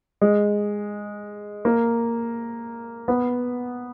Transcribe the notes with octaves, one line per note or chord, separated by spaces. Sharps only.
G#3
A#3
B3